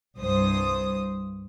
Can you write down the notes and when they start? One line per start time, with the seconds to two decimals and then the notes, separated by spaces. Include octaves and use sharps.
0.18 C2 G2 C5 D#6